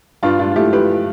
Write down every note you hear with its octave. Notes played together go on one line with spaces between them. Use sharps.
G2 D4 F4
G2 D4 F4
F4
A3 E4 G4
F3 G4 B4